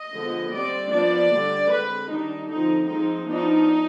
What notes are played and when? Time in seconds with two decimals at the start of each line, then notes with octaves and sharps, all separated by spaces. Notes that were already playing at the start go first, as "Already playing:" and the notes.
Already playing: D#5
0.13 D3 F3 G#3 B3
0.52 G3 C4 D5
0.92 F3 B3 D4 D5
1.31 D3 G3 D4
1.71 D3 G#3 C4 B4
2.10 D#3 G3 D4 D#4
2.49 D3 F3 C4 D#4
2.89 F3 G#3 C4 D#4
3.28 F3 B3 D4 D#4